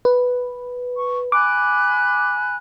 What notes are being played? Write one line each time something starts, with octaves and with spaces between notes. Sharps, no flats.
B4
C#6
G#5 B5 D6 F#6